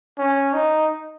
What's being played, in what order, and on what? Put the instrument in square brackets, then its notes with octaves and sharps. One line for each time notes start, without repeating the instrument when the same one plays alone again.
[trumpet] C#4
D#4